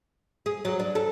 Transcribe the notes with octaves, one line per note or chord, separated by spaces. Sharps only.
G#4
F#3
D4
A4